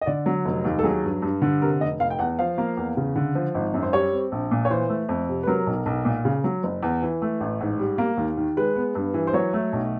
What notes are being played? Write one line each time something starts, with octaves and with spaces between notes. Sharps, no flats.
D#5
D3 D5
F#3
F1
D#2
A4
F#3 G#4
G2
G2
D3
C3 A#4
F1 D#5
F1 F5
G5
E2 F#5
F3 F5
A#3
E2
C#3
D3
F3
G#1
F#2
C5
G3 C#5
C4
A#1
A#2
C#5
E3 C5
A3
F2
C3
B4
F#3 A#4
B1
B1
A#2
C#3
F#3
F#1
E2
E3
A3
A1
G#2
G3
A#3
D#2
D#3
G#3 B4
B3
G2
E3
C5
F#3 C#5
A3
B1